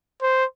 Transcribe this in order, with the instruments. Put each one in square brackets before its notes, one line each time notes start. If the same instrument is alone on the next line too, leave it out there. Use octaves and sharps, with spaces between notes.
[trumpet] C5